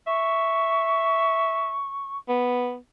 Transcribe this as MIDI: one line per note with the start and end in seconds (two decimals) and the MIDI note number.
0.07 1.79 76
0.07 2.18 85
2.29 2.77 59